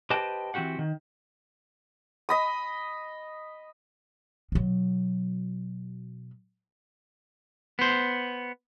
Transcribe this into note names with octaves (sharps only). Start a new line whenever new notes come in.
G4 B4 C5 D#5 G5 A5
E3 C4 F#4 G4 F#5
D#3
D#5 B5 D#6
B2 F#3
B3 C5